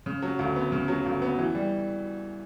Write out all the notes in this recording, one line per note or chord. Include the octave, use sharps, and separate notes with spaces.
C#3
F#3
D2
B3
C#3
F#3
D2
B3
E3
G3